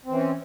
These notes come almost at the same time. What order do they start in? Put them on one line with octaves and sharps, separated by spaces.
C4 E3 C#4